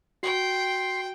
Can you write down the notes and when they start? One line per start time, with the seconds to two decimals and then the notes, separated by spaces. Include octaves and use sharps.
0.23 F#4 G5 C6